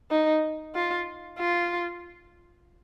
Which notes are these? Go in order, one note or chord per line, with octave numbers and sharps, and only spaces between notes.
D#4
F4
F4